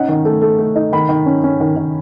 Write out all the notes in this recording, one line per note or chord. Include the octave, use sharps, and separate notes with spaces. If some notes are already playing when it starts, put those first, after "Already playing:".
Already playing: C#4 D#4 F#5
D#3
A3
A3
A3
D#4
D#3 B5
D#3
C#4
C#4
D#3
D#3